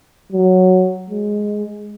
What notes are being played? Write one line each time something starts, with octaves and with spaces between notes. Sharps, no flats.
F#3
G#3